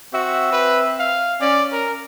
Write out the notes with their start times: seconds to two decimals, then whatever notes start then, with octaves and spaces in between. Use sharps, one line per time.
0.13 C4 F#4 E5
0.52 B4
0.99 F5
1.41 C#4 D5
1.72 A#4